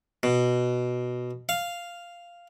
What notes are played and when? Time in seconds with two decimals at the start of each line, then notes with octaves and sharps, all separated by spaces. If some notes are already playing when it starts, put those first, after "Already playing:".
0.23 B2
1.49 F5